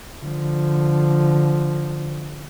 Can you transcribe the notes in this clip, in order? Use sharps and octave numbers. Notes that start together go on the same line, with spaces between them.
D3 F3